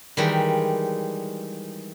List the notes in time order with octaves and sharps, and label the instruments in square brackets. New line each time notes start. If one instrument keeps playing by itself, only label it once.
[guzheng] D#3 E3 G3 G#3